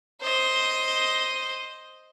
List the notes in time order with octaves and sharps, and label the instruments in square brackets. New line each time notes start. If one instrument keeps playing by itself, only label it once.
[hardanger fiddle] C5 D#5